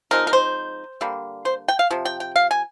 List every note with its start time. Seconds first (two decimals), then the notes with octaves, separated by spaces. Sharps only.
0.11 F3 G#3 C4 D#4 A#4
0.27 A#4
0.33 C5
1.01 D3 G3 A#3
1.45 C5
1.68 G5
1.79 F5
1.91 C3 F3
2.05 G5
2.20 G5
2.36 F5
2.51 G#5